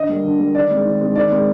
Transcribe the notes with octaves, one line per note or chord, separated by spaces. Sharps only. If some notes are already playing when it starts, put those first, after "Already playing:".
Already playing: D3 D#5
G3 A#3
D3
G3 A#3
D#3 D5
G#3 C4
D#3
G#3 C4
D#3 D5
G#3 C4